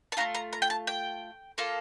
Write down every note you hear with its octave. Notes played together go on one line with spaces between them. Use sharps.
A5
A3 D4 F4 A#5
A#5
A#5
G5
A5
G5
A#3 F4 A4